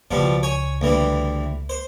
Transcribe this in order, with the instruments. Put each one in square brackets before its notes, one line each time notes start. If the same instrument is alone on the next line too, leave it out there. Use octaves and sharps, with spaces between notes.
[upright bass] C#2 [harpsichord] B2 F3 G3
[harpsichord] C#5 G#5
D2 E3 G3
C5